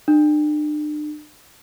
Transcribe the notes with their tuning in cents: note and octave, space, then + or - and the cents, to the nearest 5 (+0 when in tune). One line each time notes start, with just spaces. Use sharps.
D4 +40